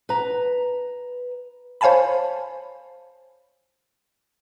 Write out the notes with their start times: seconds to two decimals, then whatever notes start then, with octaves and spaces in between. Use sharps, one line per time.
0.09 B4 A#5
1.81 C5 C#5 F5 G#5 A5 B5